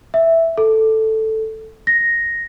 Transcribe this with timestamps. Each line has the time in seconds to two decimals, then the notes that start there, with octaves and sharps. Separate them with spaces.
0.14 E5
0.58 A4
1.87 A#6